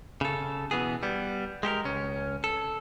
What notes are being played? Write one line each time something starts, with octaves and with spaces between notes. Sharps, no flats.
C#3 A4
B2 E3 B3 G#4
G3 B3
G#3 G4 A4 A#4
C#2 C#4
A4